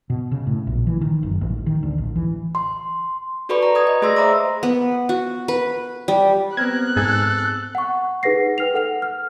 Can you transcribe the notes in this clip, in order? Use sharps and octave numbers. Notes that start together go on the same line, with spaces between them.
B2
C#3
A2
A#1
E3
D#3
F#1
A1
D#3
D2
A1
E3
C6
F#4 A4 B4 D5 B5 C#6
A#5
B4 D#6 G#6
D#5
A3 G#4 D5 C6 E6 A#6
C5 E5 A#5 B5 D6
B3
F#4
B4
G3
B3 C4 A#4 F#6 G#6
G#2 G#4 A4 G#6
F#5 C#6
D#4 G#4 B4 F#5 A#6 C7
B4 G5 F6 C7 F7
A4 F#5 F7
F6